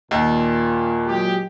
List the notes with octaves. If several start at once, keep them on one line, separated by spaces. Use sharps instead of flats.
D#2 A#2
F#3 G#3 G4